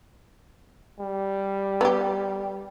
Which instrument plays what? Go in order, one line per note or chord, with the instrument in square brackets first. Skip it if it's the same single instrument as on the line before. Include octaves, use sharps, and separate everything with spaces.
[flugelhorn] G3
[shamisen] B3 G4